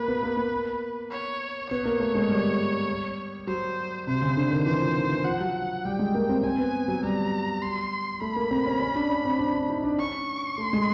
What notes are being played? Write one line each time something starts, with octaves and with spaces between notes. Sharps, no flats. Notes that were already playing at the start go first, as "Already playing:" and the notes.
Already playing: A#3 B4
B3
A#3
A#3
C#5
B3 C#5
A#3
A3
G#3
G3
F#3 C5
C3 C5
C#3
D3
D#3
E3 C5
F3
D#3
E3
F3 F#5
F#3
G3 G5
G#3
A#3
C4
C4 G#5
B3
F#3
G3 A#5
C6
A3 B5
A#3
C4
C#4
C#4
D4
C#4
C4
D4
D4
D#4
D4
C#4 C#6
A3 C6
G#3